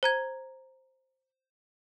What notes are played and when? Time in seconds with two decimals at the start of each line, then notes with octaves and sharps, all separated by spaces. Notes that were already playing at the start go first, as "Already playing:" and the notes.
0.03 C5 A#5 G#6